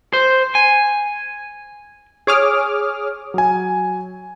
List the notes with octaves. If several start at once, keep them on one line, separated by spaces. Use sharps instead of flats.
C5
G#5
G#4 C#5 D6 D#6 F6
F#3 G#5